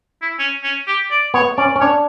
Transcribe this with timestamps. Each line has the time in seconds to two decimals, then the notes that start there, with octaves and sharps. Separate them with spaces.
0.22 E4
0.39 C#4
0.63 C#4
0.88 G4
1.11 D5
1.34 B3 C#5
1.58 C#4 D5
1.76 C#4
1.81 D4 C#5